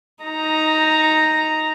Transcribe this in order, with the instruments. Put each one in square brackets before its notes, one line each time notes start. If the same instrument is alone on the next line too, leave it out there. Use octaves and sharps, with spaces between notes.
[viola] D#4 A#5